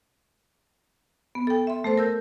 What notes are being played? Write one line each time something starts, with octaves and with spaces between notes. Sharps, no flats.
B3
A4 G5
E5 C6
A3 A4 C5
A#4 E6 G6